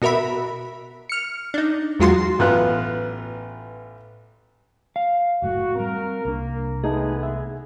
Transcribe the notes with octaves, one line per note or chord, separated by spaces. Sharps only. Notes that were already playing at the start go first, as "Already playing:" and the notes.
B2 F#4 A#4 E5 B5
F6 C#7
D4 D#4
E2 F#3 G#3 F4 F#4 C6
A1 B3 F4 F#6
F5
F#1 A2 A3 F#4
G3 C4 A#4
C2 A#3 D4
E3 G#3 A3 B3 D#4 G#4 A4
E5